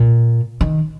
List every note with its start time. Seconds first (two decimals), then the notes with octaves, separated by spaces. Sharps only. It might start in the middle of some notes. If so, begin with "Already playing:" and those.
Already playing: A#2
0.61 D#3